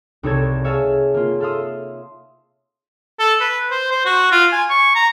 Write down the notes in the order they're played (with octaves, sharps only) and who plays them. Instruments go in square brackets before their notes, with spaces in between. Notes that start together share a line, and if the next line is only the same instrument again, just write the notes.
[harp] C2 D#4 A4 C#5 A5 G#6
G#4 C#5 E5 F5 G#5 A5
A#3 F4
A4 E5 F5 C6 D#6
[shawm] A4
B4
C5
C5
F#4
F4
G#5
C#6
A#5